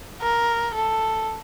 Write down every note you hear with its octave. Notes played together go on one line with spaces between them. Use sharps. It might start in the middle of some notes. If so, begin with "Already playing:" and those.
A#4
A4